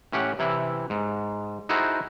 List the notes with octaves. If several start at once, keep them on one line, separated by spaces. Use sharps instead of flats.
A2 C#4 G4 F#5
C3 E3 E4
G#2
D#4 E4 F#4 G#4 A4 C5